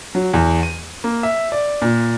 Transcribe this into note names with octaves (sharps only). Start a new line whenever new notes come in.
F#3
E2
D#7
A#3
E5
D5
A#2